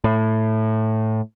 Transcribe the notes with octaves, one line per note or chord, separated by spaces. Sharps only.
A2